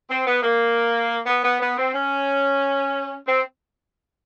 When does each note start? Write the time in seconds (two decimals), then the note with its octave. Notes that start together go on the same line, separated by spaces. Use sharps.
0.09 C4
0.26 B3
0.43 A#3
1.26 B3
1.43 B3
1.60 B3
1.77 C4
1.94 C#4
3.27 C4